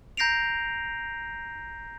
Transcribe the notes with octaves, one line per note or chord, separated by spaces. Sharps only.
A#5 G6 A#6 C7 D7 F7